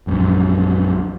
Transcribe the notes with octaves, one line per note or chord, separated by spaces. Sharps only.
A#1 F#2